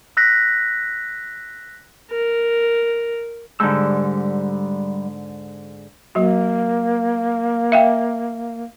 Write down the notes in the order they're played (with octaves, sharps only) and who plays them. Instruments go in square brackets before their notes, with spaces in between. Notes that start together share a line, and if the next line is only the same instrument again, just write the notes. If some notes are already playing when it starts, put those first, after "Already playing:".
[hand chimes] E6 F#6 A#6 B6
[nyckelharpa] A#4
[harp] G#2 D3 [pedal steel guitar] G3 E6
[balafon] F#3 F#4 [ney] A#3
[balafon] E5 F5 G5